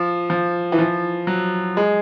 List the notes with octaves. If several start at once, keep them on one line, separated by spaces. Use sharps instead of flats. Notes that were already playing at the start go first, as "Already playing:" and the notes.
Already playing: F3
F3
E3
F3
F#3
G#3